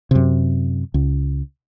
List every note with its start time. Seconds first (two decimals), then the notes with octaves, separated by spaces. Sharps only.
0.11 F#2 C3
0.94 C#2